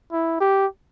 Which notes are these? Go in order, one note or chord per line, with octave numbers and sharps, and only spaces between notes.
E4
G4